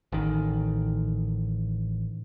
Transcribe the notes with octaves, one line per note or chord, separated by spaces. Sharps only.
A1 D#3